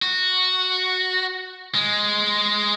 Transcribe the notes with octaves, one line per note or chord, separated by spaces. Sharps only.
F#4
G#3